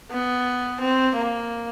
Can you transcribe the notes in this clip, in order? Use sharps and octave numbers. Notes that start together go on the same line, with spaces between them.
B3
C4
A#3